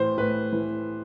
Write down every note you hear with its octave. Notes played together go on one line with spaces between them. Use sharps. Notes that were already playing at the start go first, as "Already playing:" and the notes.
Already playing: A2 E3 C5
A2 B4
E3